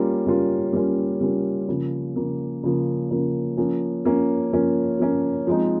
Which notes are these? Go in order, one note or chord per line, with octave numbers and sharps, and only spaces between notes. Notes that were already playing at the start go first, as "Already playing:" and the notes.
Already playing: G3 A#3 C#4 F4
G3 A#3 C#4 F4
G3 A#3 C#4 F4
G3 A#3 C#4 F4
C#3 F3 A#3
C#3 F3 A#3
C#3 F3 A#3
C#3 F3 A#3
F3 A#3 C#4
F3 A#3 C#4
F3 A#3 C#4
F3 A#3 C#4
F3 G#3 C4 D#4